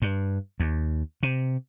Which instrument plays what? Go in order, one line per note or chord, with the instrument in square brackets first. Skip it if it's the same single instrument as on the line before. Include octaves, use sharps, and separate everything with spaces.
[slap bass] G2
D#2
C3